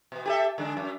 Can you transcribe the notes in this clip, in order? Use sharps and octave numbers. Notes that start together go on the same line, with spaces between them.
B2 B3
G4 A4 E5
D3 G#3 D4
F#2